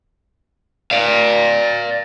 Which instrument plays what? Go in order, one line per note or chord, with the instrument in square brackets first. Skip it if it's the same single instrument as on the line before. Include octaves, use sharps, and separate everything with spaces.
[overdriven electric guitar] D5 F5